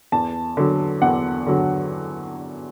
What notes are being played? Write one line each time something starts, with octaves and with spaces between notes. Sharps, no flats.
E2 A5
D3 F#3
E2 F#5
D3 F#3